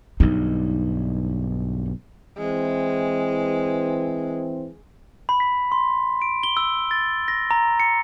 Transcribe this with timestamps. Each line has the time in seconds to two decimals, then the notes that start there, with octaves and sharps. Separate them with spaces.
0.20 B1 G2 D#4
2.38 E3 G#3 C4
5.29 B5
5.40 B6
5.72 C6
6.22 D7
6.43 G7
6.57 E6
6.91 A6
7.28 A#6
7.51 A#5
7.80 C#7